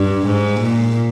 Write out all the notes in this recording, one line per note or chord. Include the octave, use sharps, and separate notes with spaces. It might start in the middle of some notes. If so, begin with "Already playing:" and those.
Already playing: G2
G#2
A#2